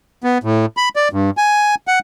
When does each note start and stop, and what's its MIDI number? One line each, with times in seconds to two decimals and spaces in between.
0.24 0.38 59
0.44 0.66 45
0.77 0.89 83
0.96 1.08 74
1.12 1.30 43
1.37 1.75 80
1.87 1.99 78